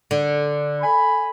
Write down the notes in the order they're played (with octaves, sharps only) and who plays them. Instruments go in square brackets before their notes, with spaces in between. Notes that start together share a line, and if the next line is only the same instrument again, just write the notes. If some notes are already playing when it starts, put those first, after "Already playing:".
[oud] D3
[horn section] G#5 B5